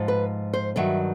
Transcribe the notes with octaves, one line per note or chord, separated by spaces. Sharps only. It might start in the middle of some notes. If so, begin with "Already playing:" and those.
Already playing: G#2 F3
B4
C5
G2 D#3 F#3 E5